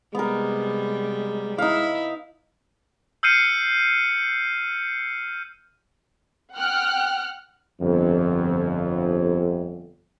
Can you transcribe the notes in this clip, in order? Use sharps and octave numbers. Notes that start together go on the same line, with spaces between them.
C3 G3 G#3 B3 A#4
D#4 E4 F5
E6 F6 G6 C7 C#7 D#7
F#5 G5 F6 F#6
G1 F2